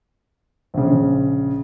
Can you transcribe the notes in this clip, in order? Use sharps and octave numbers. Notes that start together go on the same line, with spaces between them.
A#1 C#3